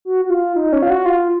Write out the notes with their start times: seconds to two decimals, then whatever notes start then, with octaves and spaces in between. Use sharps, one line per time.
0.05 F#4
0.25 F#4
0.30 F4
0.56 D#4
0.73 C#4
0.82 F4
0.90 F#4
1.06 F4